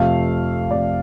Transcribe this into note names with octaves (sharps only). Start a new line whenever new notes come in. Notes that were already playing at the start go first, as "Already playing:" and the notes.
Already playing: F2 C3 F3 A3 F5
F2 C3 F3 A3 D5